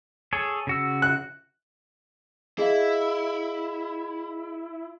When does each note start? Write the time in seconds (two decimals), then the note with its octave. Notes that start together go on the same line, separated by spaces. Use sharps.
0.33 G#4 A4 C#5
0.67 C#3 F#4 E6
1.02 F#6
2.58 E4 G#4 D#5 F5